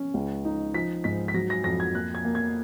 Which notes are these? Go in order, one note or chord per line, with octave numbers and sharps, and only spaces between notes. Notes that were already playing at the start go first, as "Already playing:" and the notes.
Already playing: C#4
C#2
D#4
F3 B6
G#2 B6
B6
F#3 A#6
A#6
F2 A#6
G#6
A#3 F#6
G#6
A#3
G#6